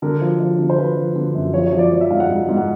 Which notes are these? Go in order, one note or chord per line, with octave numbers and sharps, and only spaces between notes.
D3 A#4
F3
F3
D3
C5
F3 B4
F3
D3
F#2
F3 C#5
C#5
F3
D5
F3 D5
E5
G#2 F5
F#5
G#2
G#2
F#5